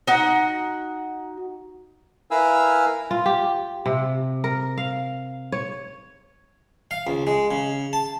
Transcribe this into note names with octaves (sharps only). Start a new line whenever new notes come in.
D#4 F#4 F#5
E4 A#4 B4 F5 G#5 E6
F4
G4
C3
A#4
F5
C#5
F5
C#2
G#3
C#3
A5